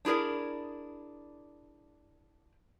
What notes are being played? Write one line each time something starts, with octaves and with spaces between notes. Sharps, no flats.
D4 E4 G#4 A#4 D5